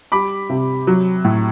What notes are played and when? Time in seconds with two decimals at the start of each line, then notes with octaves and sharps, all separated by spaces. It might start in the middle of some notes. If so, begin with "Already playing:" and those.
0.12 G3 B5 D6
0.50 C3
0.87 F#3
1.25 A2